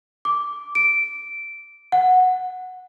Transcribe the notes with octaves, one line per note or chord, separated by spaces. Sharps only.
D6
D7
F#5